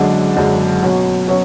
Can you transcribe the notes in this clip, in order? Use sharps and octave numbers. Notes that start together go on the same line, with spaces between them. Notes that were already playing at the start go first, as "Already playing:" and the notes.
Already playing: F#1 F#2 D3 G#3 D4
F#1 F#2 D3 G#3 D4
B2 F#3 C#4
B2 F#3 C#4